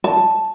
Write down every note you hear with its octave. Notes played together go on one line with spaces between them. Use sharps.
A5